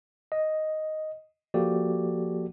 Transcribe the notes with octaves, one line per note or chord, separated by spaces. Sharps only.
D#5
F3 A#3 F#4 G4 A4 D5